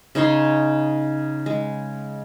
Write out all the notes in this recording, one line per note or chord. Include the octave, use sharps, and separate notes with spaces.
C#3 D#4 C#5 C6
G#3